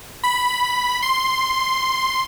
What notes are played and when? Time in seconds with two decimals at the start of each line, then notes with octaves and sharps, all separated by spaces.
0.24 B5
1.02 C6